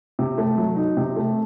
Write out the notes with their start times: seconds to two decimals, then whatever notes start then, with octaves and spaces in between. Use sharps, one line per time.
0.19 C3
0.38 A3
0.58 F#3
0.76 D#4
0.97 C3
1.16 A3